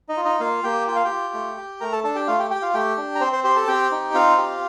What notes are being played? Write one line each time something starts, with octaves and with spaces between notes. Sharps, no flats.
D#4 D#5
F4
D#4 D#5
A#3 F4 F5
A#3 G4 G5
F4 G5
F5
G4 G5
F4
A3
G4
A3 A#4 A#5
A4 A5
D4 A4 A5
G4 G5
A3 F4 F5
G4 G5
G4 G5
F4 F5
A3 G4 G5
D4
A#5
C4 C5 C6
C5 C6
G4 C5 C6
A4 A5
C4 G4 G5
D#4
C4 F4 F5
G4